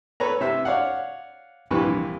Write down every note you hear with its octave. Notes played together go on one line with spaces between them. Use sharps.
A4 B4 C#5 A#5
C3 C5 E5
C#5 D5 F5 F#5
A#1 G2 C3 E3 B4 C#6